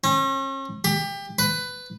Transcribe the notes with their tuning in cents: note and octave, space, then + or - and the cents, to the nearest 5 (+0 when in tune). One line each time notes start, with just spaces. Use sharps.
C#4 -40
G4 +25
B4 +15